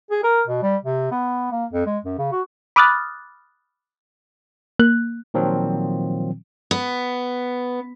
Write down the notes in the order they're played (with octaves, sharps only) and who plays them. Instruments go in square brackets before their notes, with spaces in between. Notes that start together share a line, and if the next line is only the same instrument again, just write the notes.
[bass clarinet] G#4
A#4
B2
G3
C3
B3
A#3
F2
G#3
F#2
C#3
F#4
[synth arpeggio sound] B5 D6 D#6 F6 F#6 A6
A#3 F#6
[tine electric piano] A#2 D#3 F3 F#3 C4
[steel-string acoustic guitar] B3